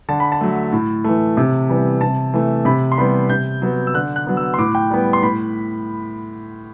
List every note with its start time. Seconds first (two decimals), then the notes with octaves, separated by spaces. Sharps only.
0.09 D3 A5
0.20 B5
0.32 A5
0.41 F#3 A3
0.72 A2
1.04 E3 A3
1.37 C3
1.69 E3 G3 B3
2.01 C3 A5
2.34 E3 A3
2.65 C3 B5
2.92 C6
2.98 E3 G3 B3 B5
3.29 C3 G6
3.62 F#3 B3
3.87 E6
3.94 D3 F#6
4.16 F#6
4.27 F#3 B3
4.37 E6
4.54 C6
4.58 A2 D6
4.75 G5
4.90 G3 B3
5.13 C6
5.23 A2 B5